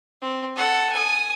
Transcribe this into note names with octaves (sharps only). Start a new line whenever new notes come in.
C4
A4 F#5
G#5 D#6